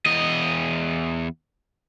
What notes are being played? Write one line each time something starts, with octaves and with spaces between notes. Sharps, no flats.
E2 D#5